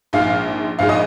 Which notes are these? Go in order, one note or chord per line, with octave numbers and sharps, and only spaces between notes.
A#1 G#2 G#3 F5
A#1 G#2 G#3 F5
D#5